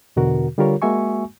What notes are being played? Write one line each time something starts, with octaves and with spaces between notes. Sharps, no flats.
E2 B2 D3 F#4 A#4
D3 G3 F4 G4 A#4 C#5
G#3 A#3 F#4 E5 G#5 C#6